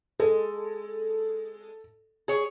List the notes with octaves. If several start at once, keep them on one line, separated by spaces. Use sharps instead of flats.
G#3 A4
G#4 C#5